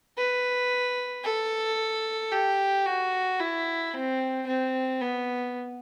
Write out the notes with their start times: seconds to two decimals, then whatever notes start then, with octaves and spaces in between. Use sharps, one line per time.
0.17 B4
1.24 A4
2.32 G4
2.86 F#4
3.40 E4
3.93 C4
4.47 C4
5.01 B3